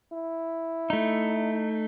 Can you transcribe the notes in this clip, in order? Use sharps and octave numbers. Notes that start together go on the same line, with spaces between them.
E4
A3 D#4